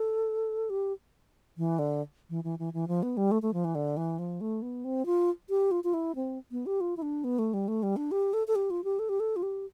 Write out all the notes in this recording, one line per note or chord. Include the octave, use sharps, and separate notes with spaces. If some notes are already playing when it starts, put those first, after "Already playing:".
Already playing: A4
G4
E3
D3
E3
E3
E3
E3
F3
B3
G3
A3
A3
F3
E3
D3
E3
F3
A3
B3
C4
F4
G4
F4
F4
E4
C4
B3
G4
F4
E4
D4
B3
A3
G3
A3
G3
D4
G4
A4
A4
G4
F4
G4
A4
G4
A4
F4
G4